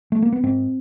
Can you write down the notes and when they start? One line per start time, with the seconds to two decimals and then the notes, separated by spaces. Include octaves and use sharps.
0.12 A3
0.22 A#3
0.32 B3
0.43 G#2 C4